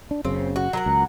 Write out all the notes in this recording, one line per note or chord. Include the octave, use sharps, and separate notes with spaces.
D4
F#1 F#2 C#3 C4
F#4
F#3 A#4 F#5
C#2